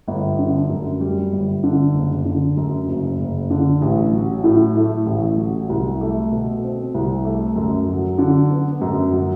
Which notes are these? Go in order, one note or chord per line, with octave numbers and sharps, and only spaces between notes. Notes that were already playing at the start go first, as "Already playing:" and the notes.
G1
D3
F#2
G3
G1
D3
F#1
D3
F#2
F#1
F#1
D3
A1
F#3
A2
A3
A1
F#3
C2
A3
B2
C4
C2
A3
F#2
F#3
D3
B3
F#2
F#3